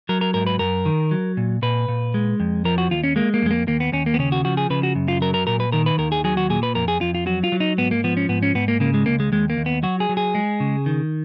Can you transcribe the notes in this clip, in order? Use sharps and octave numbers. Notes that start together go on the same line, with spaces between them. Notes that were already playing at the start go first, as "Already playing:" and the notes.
F#3 A#4
A#4
G#2 A#4
B4
F#2 A#4
D#3
F#3
A#2
A#2 B4
A#2
G#3
F2
F3 A#4
F#4
D#2 F4
C#4
G#3 A#3
A#3
F2 G#3
A#3
D#2 A#3
B3
D#2 C#4
A#3
B3
C#3 C#4
F#4
F3 F#4
G#4
C#3 B4
F#4
F#2
F4
F#3 A#4
A#4
A#2 A#4
B4
D#3 A#4
B4
D#2 A#4
G#4
F#3 G#4
F#4
A#2 G#4
B4
F2 A#4
G#4
F2 F4
F4
F#3 F#4
F4
F#3
D#4
G#2 B3
A#3
F3 B3
C#4
G#2 B3
C#4
G#2 B3
A#3
C#3 A#3
G#3
C#2 A#3
G#3
D#2 G#3
A#3
D#2
B3
F#3 F#4
G#4
F#3
G#4
G#3
C#3
D#3